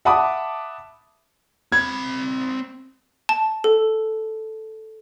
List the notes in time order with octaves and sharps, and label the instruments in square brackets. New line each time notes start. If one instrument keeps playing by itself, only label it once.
[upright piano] E5 F#5 A5 B5 D6 D#6
[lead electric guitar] C4 B5 [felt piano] G#6
[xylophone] A5
A4